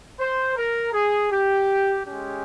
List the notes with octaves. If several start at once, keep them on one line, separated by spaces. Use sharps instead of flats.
C5
A#4
G#4
G4
G#3 C#4 G4